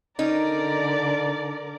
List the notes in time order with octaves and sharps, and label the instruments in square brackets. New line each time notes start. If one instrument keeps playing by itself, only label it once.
[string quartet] D3 A#4 D5 [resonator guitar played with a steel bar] C#4 D#4